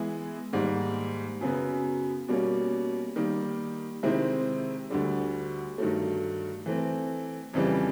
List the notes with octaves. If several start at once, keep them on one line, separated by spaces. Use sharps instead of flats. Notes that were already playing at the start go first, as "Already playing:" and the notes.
Already playing: E3 G#3 B3 E4 G#4
G#2 D#3 G3 A#3
F#2 C#3 F#3 B3
B2 G3 A#3 C#4
D#3 G3 A#3
C3 D#3 G#3 C4 E4
D2 D3 G3
G2 D#3 F#3 A3
E3 A3 C4
F2 C#3 E3 G3